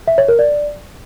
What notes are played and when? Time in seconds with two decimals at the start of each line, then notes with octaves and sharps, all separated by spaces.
0.08 E5
0.18 C#5
0.28 A#4
0.39 D5